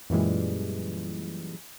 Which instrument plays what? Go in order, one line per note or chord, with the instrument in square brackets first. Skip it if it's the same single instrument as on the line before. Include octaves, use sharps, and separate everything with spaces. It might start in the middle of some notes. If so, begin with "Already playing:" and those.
[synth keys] F#2 A#2 E3 G3 G#3